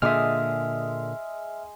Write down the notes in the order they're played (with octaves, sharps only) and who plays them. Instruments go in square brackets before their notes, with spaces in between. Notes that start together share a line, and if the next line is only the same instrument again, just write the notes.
[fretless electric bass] A#2 D3 [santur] G#3 D#6 [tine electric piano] E5 F6